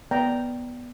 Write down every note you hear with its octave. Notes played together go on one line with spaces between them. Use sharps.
B3 D5 G5 A#5